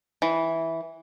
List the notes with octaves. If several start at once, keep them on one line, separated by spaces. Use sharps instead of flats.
E3